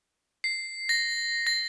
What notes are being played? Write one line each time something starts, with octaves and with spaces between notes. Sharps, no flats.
C7
A#6
A#6